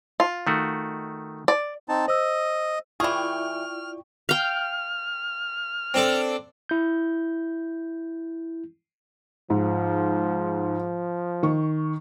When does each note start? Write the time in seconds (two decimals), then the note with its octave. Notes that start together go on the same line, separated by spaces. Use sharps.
0.20 F4
0.47 D#3 A3 F#4
1.48 D5
1.89 C4 D#4 A5
2.08 C5 D#5 E6
3.00 E3 E4 F4 G#4 D5 G5 C#6 F6
4.29 F5 G5 F6
5.94 C4 D4 A4
6.69 E4 G6
9.50 G#2 F3
11.43 D#3 C#6